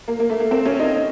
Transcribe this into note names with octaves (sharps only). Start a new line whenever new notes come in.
A#3
A#3
A3
A#3
C4
C#4
D#4